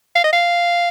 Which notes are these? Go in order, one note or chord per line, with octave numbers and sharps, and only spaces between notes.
F5
D#5
F5